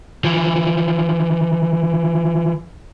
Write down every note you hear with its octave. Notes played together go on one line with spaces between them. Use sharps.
E3 F3